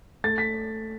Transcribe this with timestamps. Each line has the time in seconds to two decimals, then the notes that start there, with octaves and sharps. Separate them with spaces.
0.24 A3 A6
0.38 B6